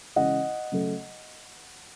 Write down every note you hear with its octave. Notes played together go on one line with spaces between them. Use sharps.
C#3 E3 G#3 C#4 E4 D#5 F#5
C#3 F#3 A3